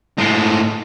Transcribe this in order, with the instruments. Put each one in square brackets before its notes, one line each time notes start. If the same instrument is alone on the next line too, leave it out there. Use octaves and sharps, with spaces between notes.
[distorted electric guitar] A2 G#3